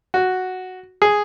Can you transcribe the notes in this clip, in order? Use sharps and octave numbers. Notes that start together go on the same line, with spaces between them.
F#4
G#4